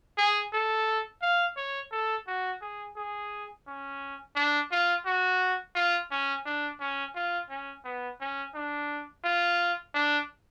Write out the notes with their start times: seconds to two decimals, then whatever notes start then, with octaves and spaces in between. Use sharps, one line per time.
0.18 G#4
0.53 A4
1.22 F5
1.57 C#5
1.92 A4
2.27 F#4
2.62 G#4
2.97 G#4
3.67 C#4
4.36 D4
4.71 F4
5.06 F#4
5.75 F4
6.11 C#4
6.46 D4
6.81 C#4
7.16 F4
7.50 C#4
7.85 B3
8.21 C#4
8.55 D4
9.24 F4
9.95 D4